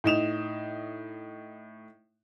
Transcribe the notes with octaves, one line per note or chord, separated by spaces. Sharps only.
A2 D#4 E7 F7